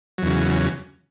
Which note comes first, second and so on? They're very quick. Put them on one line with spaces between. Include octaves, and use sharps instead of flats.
F#3 E2 C#3